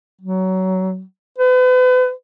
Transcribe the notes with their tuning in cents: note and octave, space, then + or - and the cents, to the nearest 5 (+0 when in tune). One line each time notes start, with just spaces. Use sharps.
F#3 +20
B4 +40